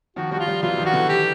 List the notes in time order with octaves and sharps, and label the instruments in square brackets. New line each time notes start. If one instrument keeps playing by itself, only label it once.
[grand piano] D#3 F3 [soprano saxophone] F#4
[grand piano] F3 G3 [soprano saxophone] F#4
[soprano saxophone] F4
[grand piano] F3 G3
[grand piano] E3 F#3 [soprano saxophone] F4
[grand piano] D#3 F3
[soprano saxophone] F#4
[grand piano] D3 E3
[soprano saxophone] G4